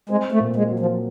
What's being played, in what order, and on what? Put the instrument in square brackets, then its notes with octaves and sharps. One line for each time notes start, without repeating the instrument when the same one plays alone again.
[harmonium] G#3 [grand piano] C4
[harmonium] A3
[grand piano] A#2
[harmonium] G#3
[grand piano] F#3
[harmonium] F3